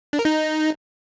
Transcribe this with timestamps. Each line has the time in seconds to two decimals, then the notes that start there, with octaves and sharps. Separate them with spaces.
0.13 D4
0.19 A#4
0.25 D#4